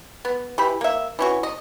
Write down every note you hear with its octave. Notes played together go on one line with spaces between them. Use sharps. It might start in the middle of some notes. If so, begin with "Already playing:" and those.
B3
E3 G4 B5
A#3 E5
E3 C#4 F#4
D#5